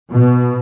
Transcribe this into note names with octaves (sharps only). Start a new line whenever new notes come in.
B2